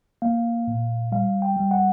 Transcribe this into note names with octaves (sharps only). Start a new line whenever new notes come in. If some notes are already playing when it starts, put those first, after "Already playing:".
A#3 F5
A#2
G3 F5
G5
G3
F#5